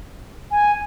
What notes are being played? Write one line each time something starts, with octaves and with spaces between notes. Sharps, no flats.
G#5